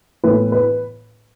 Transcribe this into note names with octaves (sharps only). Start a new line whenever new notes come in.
A2 E3 B3 E4 B4
B4